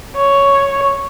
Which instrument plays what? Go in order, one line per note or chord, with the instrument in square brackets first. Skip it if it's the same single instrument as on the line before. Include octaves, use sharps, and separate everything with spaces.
[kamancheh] C#5